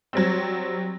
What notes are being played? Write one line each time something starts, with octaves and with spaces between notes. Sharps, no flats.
F#3 G3 C4